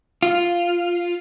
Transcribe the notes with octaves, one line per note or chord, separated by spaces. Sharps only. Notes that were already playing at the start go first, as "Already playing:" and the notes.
F4